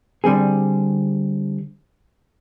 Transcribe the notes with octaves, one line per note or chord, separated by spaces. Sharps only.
D3 G3 C4 G#4